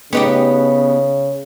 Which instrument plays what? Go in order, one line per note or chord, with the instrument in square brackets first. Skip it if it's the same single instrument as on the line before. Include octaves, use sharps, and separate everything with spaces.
[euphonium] C#3 [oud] B3 D#4 G4